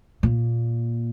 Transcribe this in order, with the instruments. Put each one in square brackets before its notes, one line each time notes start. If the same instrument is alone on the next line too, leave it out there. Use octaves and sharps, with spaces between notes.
[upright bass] A#2